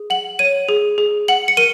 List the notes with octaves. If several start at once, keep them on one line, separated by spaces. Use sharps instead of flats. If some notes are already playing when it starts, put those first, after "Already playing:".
Already playing: G#4
F#5 F#7
C#5 D#7
G#4
G#4
F#5 F#7
C#7
A#4 D#7